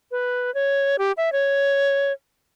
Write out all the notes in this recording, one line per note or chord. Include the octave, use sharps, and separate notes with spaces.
B4
C#5
G4
E5
C#5